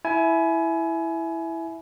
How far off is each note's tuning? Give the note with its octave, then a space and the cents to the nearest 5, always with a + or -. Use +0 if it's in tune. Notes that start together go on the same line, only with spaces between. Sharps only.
E4 +0 G#5 +25